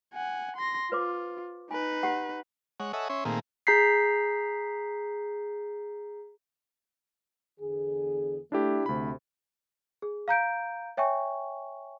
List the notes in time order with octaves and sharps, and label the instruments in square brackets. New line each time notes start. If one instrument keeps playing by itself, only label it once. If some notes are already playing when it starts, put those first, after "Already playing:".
[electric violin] F#5 G#5
C6 A#6
[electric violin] F4 [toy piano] B4 C5 D6
[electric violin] D#4 B4 [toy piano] G#5
[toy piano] G4 F#5
[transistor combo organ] G#3 C#5 F#5
A4 C#5 D#5 E5 F#5 G#5
C#4 C#5 E5 C6
A#2 D#3 A3 A#3 C4 G#4
[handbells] G#4 A#5 G6 B6 C7
[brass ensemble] E2 D3 G#4
[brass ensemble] A3 [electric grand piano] D4 E4 G4
[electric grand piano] D2 B5 [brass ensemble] C3
[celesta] G#4
F5 A#5 G6 D7
C#5 E5 G5 G#5 C#6